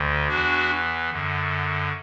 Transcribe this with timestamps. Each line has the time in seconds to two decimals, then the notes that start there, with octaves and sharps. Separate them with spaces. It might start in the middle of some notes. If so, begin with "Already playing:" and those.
Already playing: D2 D3
0.28 E2 E3 D4 F#4
1.10 F#2 D3